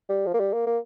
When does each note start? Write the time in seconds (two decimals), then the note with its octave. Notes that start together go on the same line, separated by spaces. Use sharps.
0.09 G3
0.26 F3
0.34 A#3
0.40 G3
0.53 A#3
0.67 A#3